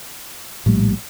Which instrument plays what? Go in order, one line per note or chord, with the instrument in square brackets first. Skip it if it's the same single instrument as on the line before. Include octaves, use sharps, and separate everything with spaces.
[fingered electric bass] A#1 A2 G3